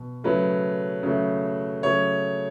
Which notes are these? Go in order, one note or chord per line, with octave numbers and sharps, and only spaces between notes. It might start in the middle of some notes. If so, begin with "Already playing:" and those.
Already playing: B2
C#3 F#3 A3 B4
C#3 F#3 A3
C#3 F#3 A3 C#5